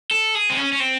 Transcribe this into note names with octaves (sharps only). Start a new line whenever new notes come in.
A4
G#4
C4
C#4
C#4
C4